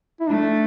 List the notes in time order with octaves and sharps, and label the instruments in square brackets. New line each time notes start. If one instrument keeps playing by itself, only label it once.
[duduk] E4
[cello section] A3 [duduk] D4